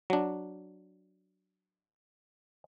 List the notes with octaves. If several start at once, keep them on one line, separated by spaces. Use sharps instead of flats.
F#3 D4